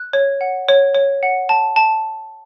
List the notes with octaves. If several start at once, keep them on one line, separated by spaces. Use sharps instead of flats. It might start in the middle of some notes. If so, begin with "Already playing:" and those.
Already playing: F#6
C#5
F#5
C#5
C#5
F#5
A5
A5